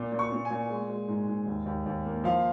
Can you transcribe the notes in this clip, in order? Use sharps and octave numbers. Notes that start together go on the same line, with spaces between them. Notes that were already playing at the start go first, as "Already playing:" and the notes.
Already playing: A#2
A#2
C#6
A#2
G#5
A#2
G#3
G#3
G#2
G#2
D#2
D#2
D#2
A#3
F3 F5